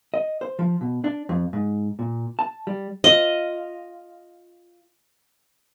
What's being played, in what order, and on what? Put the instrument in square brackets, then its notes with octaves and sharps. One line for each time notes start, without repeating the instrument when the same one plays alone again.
[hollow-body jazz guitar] D#5
C5
F3
B2
D4
F2
G#2
A#2
A5
G3
[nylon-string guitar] F4 [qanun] D#5